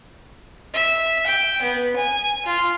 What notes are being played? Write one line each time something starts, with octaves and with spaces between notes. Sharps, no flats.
E5
G5
B3
G#5
F4